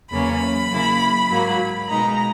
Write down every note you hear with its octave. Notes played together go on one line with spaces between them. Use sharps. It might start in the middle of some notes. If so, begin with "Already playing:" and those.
E2 C#3 F#3 A#3 C#4 B5
C#3 F#3 A#3 E4
G#2 F#3 A#3
B2 G#3 D#4 A#5